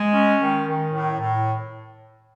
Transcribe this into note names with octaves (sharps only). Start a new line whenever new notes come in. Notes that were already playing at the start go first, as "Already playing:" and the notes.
Already playing: G#3
C#4
D#3
D#3
A2
A2